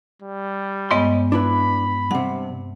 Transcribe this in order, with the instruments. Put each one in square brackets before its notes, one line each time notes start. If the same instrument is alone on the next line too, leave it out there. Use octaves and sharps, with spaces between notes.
[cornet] G3
[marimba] G2 G#3 B3 [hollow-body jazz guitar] C#5 D#5 C6
[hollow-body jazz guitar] D4 E4 B4 [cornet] B5
[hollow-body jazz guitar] G2 C3 [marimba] F#5